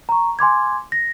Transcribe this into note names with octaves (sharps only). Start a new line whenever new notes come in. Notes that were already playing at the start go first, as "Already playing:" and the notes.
A#5 C#6
G#5 C6 D6 G#6
A#6